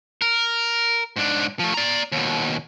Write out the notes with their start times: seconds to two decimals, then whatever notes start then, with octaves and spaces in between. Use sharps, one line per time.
0.22 A#4
1.16 G#2 D4
1.59 F3 A3
1.74 D5 A#5
2.12 D#2 B2